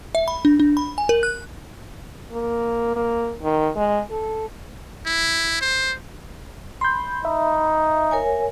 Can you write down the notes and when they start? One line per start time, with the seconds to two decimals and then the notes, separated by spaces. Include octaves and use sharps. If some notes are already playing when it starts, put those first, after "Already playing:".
0.15 E5
0.28 B5
0.45 D4
0.60 D4
0.77 B5
0.98 G#5
1.09 A#4
1.23 F#6
2.31 A#3
2.96 A#3
3.42 D#3
3.76 G#3
4.11 A4
5.06 E4
5.61 C5
6.81 B5 C6 G6
7.25 D#4 E5
8.11 A#4 C#5 G#5